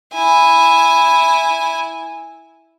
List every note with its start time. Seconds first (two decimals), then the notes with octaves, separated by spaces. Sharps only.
0.13 E4 G#5